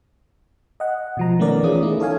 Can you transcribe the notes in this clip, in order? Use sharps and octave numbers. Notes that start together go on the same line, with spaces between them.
D#5 F#5
B2 F3 A#5
D#3 A3 B3 C#4 A#4 D5
E3 C#4 F4 G#4 D#6
A3 D#4 E4
A4 C#5 F5 G#5